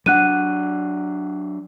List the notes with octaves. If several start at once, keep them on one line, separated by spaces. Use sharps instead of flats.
F#3 D4 F#5 F#6 D#7